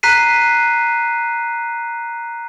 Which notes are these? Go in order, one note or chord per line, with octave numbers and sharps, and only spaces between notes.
A#5 F#6 B6 C7 D#7